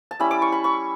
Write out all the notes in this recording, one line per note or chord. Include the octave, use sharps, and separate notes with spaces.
A5
G3 C#4 E4 B5
D6
C#6
B5
C#6